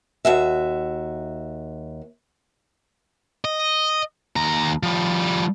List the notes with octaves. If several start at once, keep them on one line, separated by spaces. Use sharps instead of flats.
D#2 F#4 E5
D#5
D#2 A#5
F3 G3